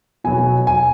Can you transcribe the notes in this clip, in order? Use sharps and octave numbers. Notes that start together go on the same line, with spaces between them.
B2 F#3 G#5
G#5